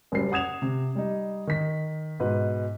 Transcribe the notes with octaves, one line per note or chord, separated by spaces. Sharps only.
F#1 F#2 G3 C7
F#5 D#6 G#6 E7 F7
C3
G3 D#4
D#3 B6
G#2 B2 B4